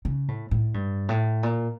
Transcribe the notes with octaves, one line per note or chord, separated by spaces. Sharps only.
C#3
A2
A2
G2
A2
A#2